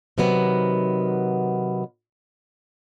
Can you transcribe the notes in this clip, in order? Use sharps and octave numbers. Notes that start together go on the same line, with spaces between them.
C3 D#3 F#3 B3